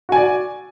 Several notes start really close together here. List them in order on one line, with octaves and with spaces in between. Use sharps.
F#4 G#5 D5